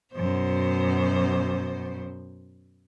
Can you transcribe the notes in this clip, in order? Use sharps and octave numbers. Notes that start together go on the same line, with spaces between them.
F#2 B2 C5